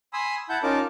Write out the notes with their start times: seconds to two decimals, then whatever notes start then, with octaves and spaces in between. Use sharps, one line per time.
0.13 G#5 B5 C6 D#6 E6
0.49 E4 F#5 A5 G6
0.63 C#4 D#4 F4 A#4 A5 D6